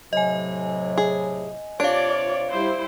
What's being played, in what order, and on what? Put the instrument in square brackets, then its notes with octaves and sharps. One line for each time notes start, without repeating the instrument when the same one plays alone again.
[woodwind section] A2 C3 F#3 [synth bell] D#5 G#5
[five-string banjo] G#4
[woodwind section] C3 C#5 [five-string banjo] D4 [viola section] F4 D5 [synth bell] F5 D7
[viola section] G3 E4 C5